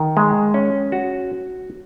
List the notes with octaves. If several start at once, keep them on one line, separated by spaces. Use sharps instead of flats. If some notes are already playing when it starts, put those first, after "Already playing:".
Already playing: D#3
G#3
C#4
F#4